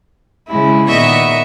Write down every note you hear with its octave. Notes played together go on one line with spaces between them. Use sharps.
C#3 G#3 E4
A#2 D#3 B3 D#5 E5 C#6